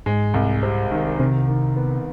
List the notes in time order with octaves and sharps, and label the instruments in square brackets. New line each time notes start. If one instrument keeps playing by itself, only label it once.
[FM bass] G#2 [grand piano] G#3
[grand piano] C2
C3
D#3
[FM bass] C3 [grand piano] D#3
[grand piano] D#3
B3